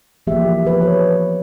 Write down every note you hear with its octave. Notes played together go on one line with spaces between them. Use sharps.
E3 F3 A#3 G4 E5
F3 B4
C#5